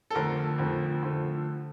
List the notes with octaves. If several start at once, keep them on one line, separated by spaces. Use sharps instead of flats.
A4
F2 D3 F3 A3 A#4
F2 D3 F3 A3
D3 F3 A3